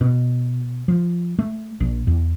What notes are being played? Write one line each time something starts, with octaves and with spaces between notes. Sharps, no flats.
B2
F3
A3
A#1
E2